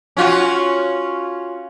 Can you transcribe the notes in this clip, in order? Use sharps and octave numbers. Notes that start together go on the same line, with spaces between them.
C#4 F4 F#4